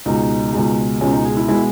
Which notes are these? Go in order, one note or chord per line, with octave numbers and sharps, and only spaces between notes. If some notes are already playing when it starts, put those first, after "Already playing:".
C#2 B2 G#3 D#4
C#2 B2 G#3
C#2 B2 G#3 C#4
D#4
G#4
E4
B2 G#3 E4